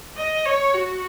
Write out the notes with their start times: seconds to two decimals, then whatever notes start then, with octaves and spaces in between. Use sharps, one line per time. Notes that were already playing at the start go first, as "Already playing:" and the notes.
0.17 D#5
0.46 C#5
0.74 F#4